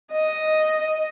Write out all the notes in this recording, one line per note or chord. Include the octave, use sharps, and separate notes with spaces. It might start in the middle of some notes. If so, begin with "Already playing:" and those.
D#5